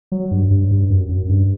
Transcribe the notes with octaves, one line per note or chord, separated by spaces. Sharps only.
F#3
G2
G2
G2
F#2
F#2
G2